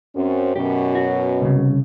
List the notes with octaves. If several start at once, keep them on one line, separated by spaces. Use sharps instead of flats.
F#2 C4 C#4
F#2 B2 C#4 G4
F#4
C2 C#3